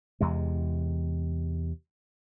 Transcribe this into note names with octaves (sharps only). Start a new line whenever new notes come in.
E2 C3 G#3